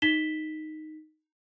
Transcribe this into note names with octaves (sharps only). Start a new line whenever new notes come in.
D#4 B6 E7 G7